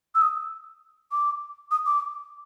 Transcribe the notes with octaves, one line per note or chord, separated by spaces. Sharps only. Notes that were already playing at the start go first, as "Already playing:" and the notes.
E6
D#6
D6
D#6
D6